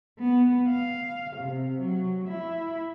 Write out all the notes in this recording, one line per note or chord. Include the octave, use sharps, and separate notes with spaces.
B3
F5
C3
F#3
E4